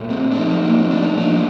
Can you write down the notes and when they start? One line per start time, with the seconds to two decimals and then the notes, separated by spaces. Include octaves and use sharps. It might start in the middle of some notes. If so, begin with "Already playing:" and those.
Already playing: A#2 A3
0.10 C4
0.32 D4
0.37 A2 F3 A3 C4 D#4
0.65 A#3
0.78 C4
0.91 D4
1.04 D#4
1.17 A2 F3 A#3 D4 F4